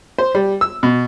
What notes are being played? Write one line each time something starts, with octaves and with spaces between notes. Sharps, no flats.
C5
G3
E6
B2